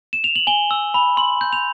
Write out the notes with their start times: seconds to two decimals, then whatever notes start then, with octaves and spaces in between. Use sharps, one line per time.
0.13 E7
0.24 F7
0.36 F#7
0.47 G#5 G7
0.71 E6
0.94 B5
1.17 C6 F#7
1.41 G6
1.53 F7